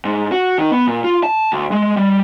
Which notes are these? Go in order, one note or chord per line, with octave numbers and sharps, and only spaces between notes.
G#2
F#4
D#3
B3
A#2
F4
A5
D2
G#3
G3